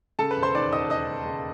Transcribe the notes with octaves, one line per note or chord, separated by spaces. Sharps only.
C#3 A4 A5
B4 B5
E1
C5 C6
D#2 D5 D6
D#2 D#5 D#6
E1 D#5 D#6
E1
C#3